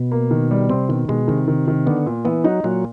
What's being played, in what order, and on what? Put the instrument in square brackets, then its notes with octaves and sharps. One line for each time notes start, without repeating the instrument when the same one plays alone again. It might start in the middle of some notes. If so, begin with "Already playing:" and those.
Already playing: [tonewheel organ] B2
[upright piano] A#3
D#3
G3
[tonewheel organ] C3 [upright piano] C4
[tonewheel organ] B2 [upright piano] D#3
[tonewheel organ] B2 [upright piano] G#3
[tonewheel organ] C3 [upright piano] D#3
[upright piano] D#3
D#3
[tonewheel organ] D3 [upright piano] B3
[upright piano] A#2
[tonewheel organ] E3 [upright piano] B3
[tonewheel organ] F#3 [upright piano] D#4
[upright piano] A#2 [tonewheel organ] F#3